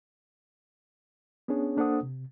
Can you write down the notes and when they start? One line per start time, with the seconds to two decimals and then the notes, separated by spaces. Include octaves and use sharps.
1.48 B3 C#4 D4 G#4 C#5
1.77 A#3 D4 A4 C5 F#5 D#6
2.03 C3